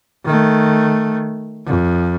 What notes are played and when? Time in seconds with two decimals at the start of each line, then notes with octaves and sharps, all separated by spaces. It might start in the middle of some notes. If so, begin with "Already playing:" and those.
0.25 D#3 A3
1.66 F2